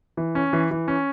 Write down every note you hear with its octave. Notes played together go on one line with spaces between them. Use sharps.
E3
C#4
E3
E3
C#4